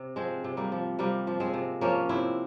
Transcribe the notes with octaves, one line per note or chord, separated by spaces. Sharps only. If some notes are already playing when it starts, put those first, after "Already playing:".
Already playing: C3
F3 G#3 C4
C3
G3 A#3
F3
C3 G3 A#3
F3
G#3 C4
C3
F3 A#3 C#4
C3 C4 E4